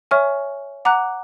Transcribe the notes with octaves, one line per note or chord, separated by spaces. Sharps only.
C#5 E5 G#5 C#6 F6
F#5 A#5 D6 F#6